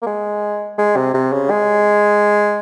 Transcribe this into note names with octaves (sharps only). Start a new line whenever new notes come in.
A#3
G#3
G#3
C3
C3
C#3
G#3